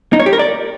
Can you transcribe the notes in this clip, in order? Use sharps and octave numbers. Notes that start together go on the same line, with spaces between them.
D#4
C#5
G4
A#4
D5